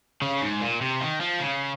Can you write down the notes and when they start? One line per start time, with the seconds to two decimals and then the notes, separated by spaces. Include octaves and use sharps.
0.22 C#3
0.41 G#2
0.61 A#2
0.81 C3
1.01 D#3
1.21 F3
1.40 C#3